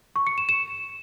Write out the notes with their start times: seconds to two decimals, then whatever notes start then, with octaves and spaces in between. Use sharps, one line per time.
0.16 C#6
0.27 C#7
0.38 E7
0.49 E7